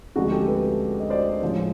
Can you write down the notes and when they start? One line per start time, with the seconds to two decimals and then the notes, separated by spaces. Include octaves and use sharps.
0.16 D2 C3 F3 G#3 F#4 G#4
0.32 G4 A4
0.48 A4 B4
1.00 D#5
1.10 C5 D5
1.42 A2 F3 G#3